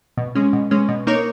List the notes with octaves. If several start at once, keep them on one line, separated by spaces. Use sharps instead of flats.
B2
G#3 C#4
B2
G#3 C#4
B2
A#3 D#4 A#4 C#5